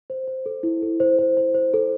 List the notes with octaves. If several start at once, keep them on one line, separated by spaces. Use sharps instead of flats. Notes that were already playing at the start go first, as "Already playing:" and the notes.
C5
C5
A4
E4
A4
C5
C5
C5
C5
A4